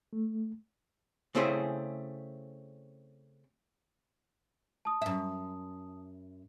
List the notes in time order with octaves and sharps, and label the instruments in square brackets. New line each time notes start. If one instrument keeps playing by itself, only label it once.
[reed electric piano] A3
[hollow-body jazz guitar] C#3 A3 C4 E4 G#4 C5
[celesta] A5 D#6
[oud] F#2 E5